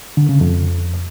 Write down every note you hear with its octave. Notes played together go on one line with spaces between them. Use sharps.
D3
C#3
F2